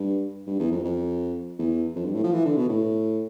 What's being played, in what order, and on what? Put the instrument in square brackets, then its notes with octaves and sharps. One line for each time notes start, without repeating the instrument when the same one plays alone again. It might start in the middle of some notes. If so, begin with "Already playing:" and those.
Already playing: [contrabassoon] G2
G2
E2
F2
F2
E2
F2
G2
A2
F3
E3
D3
B2
A2